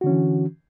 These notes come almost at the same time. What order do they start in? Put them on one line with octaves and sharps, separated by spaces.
F#4 D3 C#4 E3